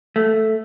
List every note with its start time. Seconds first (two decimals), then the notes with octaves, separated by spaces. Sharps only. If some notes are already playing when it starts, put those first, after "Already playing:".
0.16 A3